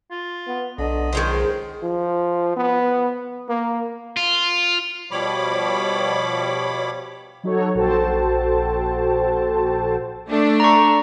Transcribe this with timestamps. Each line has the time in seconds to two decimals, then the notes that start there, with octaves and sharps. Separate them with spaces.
0.11 F4
0.47 B3
0.78 B1 D3 D#5
1.13 C#2 D#3 G#3 C5
1.82 F3
2.57 B3
3.49 A#3
4.17 F4
5.11 B2 F3 G3 C#5 B5 D6
7.44 F#3 D#4 F#4 A4 C#5
7.74 A#1 F#4 A4 C5 G5 A5
10.28 A3 D4
10.60 A#5 C#6